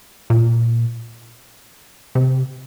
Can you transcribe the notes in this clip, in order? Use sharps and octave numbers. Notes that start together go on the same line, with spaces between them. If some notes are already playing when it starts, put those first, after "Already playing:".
A#2
C3